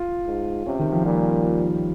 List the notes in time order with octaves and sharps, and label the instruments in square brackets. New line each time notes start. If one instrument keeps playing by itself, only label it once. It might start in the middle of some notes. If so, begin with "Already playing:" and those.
Already playing: [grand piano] F4
[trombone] G#2
[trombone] C3 [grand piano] C#4
[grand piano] D#3
F3
[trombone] A#2 [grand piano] G3